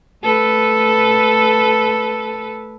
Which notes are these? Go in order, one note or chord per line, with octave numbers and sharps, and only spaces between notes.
A3 A4 B4